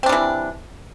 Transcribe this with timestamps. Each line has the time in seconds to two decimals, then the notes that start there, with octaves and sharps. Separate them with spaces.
0.03 C4
0.06 D4
0.09 G3
0.12 E3